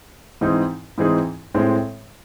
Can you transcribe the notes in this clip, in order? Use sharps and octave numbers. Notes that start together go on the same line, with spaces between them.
G#2 E3 C4 D#4 G#4
G#2 E3 C4 D#4 G#4
A2 G#3 C4